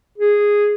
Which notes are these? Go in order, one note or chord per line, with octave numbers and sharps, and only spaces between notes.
G#4